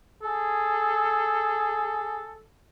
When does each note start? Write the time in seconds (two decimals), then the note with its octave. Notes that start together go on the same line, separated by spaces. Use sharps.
0.23 G#4 A4